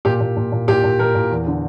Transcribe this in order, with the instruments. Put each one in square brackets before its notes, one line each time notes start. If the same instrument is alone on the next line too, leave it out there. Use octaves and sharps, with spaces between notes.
[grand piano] A#2 G4
A#2
A#2
A#2
A#2 G4
A#2
A#2 A#4
A#2
E2
D3